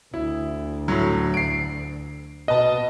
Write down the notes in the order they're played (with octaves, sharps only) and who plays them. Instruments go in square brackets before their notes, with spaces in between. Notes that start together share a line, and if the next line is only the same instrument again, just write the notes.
[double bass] D2 D3 [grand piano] E4
[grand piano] A2 F#3
C7 D7
[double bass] B2 [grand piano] B4 A5 [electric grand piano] D#5